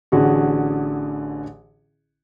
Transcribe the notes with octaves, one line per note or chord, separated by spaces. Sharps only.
A1 D3 F#4 G#4